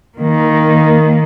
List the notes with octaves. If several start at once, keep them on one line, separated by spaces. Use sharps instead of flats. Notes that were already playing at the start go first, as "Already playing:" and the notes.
D#3 A#3